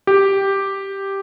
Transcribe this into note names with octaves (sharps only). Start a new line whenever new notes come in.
G4